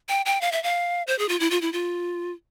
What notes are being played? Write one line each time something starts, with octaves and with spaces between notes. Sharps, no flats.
G5
G5
F5
E5
F5
C5
G#4
F4
E4
F4
E4
F4